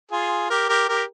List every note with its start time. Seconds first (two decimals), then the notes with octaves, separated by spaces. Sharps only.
0.12 F4 G#4
0.50 G4 A#4
0.69 G4 A#4
0.89 G4 A#4